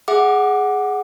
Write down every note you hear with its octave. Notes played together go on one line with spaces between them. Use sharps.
G#4 E5 F#5 D6